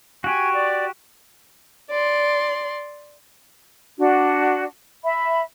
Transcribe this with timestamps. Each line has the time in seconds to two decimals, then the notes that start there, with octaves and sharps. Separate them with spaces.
0.24 F#4 G4 G#5 C#6
0.54 D5
1.91 D5 C6
3.97 D4 F#4
5.03 E5 B5